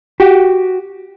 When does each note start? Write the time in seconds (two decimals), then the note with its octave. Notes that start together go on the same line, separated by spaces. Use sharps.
0.20 F#4 G4